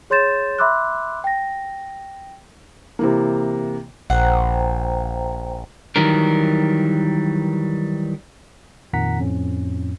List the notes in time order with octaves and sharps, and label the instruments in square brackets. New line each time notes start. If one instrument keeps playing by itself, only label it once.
[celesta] G#4 C#5 C6 G6 A6 E7
E5 B5 C6 D6 E6 F#6
G5 A#6
[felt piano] C3 E3 A#3
[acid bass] A#1 [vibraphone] C5 G5 A#5 [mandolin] F#5
[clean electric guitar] D#3 E3 F#3 G3 A#4
[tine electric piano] F2 A#2 D#3 F#5 A#5 B6
F2 A2 C#4